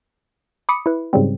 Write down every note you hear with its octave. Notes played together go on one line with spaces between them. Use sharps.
B5 D6 D#6 C#7
E4 B4
G#2 C#3 F#3 G3 C4